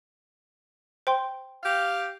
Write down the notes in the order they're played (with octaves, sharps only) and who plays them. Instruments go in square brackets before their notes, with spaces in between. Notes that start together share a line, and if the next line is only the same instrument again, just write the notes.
[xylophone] C5 G5 C6
[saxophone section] G4 F5